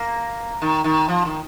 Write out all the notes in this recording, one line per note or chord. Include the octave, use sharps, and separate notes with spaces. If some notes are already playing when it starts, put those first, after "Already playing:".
Already playing: A#3
D#3
D#3
F3
D#3